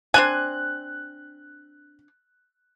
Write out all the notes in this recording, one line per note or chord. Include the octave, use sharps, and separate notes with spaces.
C4 D4 G#5 F#6